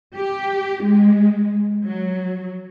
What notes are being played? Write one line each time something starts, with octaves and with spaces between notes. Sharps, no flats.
G4
G#3
F#3